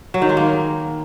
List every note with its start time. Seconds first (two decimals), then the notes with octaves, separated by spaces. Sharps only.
0.14 F#3
0.22 D#3
0.29 G#3
0.37 A#3